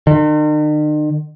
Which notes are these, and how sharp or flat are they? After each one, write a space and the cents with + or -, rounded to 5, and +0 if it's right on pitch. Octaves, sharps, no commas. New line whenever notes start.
D#3 -45